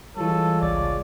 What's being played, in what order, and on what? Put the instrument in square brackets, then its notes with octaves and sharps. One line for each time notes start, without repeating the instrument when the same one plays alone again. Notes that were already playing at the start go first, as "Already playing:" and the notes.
[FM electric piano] E3 G3 [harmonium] G#3 F4 C#5 [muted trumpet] A4
[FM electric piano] G#1 C#2 A6 [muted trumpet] D5